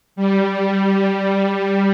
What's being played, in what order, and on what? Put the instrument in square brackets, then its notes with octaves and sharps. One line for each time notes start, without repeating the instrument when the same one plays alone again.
[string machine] G3